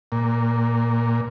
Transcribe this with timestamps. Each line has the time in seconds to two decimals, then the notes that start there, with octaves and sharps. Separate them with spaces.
0.12 A#2